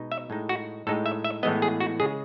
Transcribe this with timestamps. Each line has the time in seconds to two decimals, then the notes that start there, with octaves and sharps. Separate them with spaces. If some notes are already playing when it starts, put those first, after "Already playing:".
Already playing: B2 G#3 D#4
0.12 E5
0.30 A2 G#3 D#4
0.49 F#4
0.87 A2 G#3 D#4 A4
1.06 E5
1.24 E5
1.43 A2 E3 G#3 B3 D#5
1.62 G#4
1.80 F#4
2.00 C#3 G#3 G#4